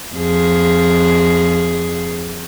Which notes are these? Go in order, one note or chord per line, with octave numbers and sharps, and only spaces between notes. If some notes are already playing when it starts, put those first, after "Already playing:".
F2 G#4